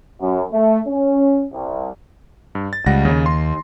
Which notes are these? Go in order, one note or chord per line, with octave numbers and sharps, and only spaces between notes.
F#2
A3
C#4
C2
G2
A6
C#2 G3 F#5 A#6
D#2 C#3
C6